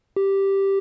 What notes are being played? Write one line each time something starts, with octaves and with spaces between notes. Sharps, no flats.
G4